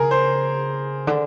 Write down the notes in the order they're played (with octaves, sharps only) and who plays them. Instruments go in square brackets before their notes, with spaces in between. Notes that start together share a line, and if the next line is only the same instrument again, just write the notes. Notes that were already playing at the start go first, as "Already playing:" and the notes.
Already playing: [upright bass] C#3 [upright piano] G#4 A#4
[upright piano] C5
[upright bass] D3